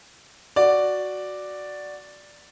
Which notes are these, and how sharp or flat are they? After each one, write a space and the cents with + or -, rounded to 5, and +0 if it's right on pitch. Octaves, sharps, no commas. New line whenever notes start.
F#4 +0 D5 +0